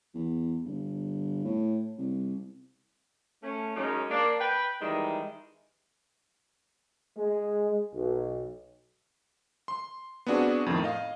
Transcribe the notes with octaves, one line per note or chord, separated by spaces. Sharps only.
E2
G1
A2
C2
A3 C#4
F#2 G#3 C#4 D#4
A#3 D4
B4 G5
D#3 E3 G3 G#3 D#4
G#3
B1
C6
B3 C4 D4 F#4 G#4
F2 A2 D#3
D#5 F5